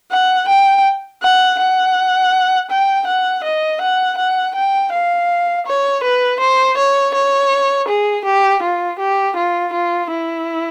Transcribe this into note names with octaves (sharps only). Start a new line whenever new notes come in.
F#5
G5
F#5
F#5
G5
F#5
D#5
F#5
F#5
G5
F5
C#5
B4
C5
C#5
C#5
G#4
G4
F4
G4
F4
F4
E4